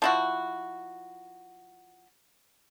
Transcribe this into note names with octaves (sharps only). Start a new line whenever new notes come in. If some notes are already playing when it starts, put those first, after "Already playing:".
F3 E4 F#4